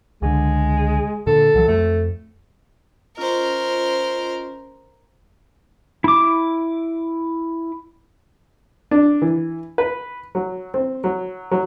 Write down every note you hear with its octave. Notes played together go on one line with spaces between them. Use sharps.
C#2 D3 G#3
A#2 D3 A4
C2 E3 F#3
F2 A3
C#4 F4 A#4 C5 D#5
E4 D6
D4
E3
B4
F#3
C4
F#3
F#3